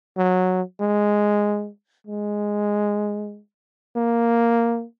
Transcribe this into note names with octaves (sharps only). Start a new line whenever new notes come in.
F#3
G#3
G#3
A#3